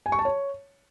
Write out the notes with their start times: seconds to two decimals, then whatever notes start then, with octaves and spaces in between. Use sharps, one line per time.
0.06 G#5
0.12 C#6
0.19 A5
0.25 C#5